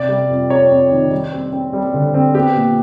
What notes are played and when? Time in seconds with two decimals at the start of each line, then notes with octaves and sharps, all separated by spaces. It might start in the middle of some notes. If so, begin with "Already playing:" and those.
Already playing: C3 D5
0.09 G3
0.30 F2
0.50 F2 C#5
0.71 F2
0.91 D#3
1.11 G3
1.32 C4
1.53 C4
1.73 G3
1.94 D3
2.14 C4
2.35 B3 G4
2.55 A#2